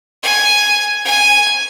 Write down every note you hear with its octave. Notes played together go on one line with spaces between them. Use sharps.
G#5
G#5